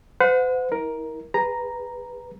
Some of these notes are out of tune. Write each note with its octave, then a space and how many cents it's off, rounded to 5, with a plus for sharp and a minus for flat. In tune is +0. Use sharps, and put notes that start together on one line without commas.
C5 -45 F#5 -30
E4 -40 A#4 +10
G#4 -30 B4 +0 A#5 +0